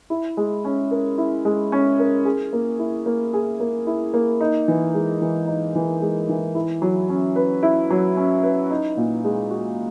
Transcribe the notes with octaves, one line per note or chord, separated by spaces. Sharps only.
E4
G#3
C#4
A#4
E4
G#3
C#4
A#4
G#4
A#3
E4
A#3
G#4
A#3
E4
A#3
D#4
E3
G#3
E3
D#4
E3
G#3
E3
E4
F#3
C#4
B4
E4
F#3
C#4
B4
D#4
A#2
G#3
F#4